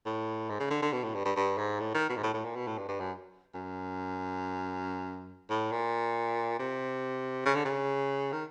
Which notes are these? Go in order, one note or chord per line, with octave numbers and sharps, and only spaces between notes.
A2
G#2
C#3
D3
D3
B2
A2
G2
G2
G2
G#2
A2
D#3
B2
G#2
A2
A2
A#2
B2
A2
G2
G2
F#2
F#2
A2
A#2
C3
C#3
D3
C#3
D#3